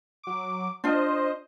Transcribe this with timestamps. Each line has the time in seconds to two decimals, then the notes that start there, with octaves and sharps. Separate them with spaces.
0.23 F#3 D6
0.84 D4 F4 C5 D#5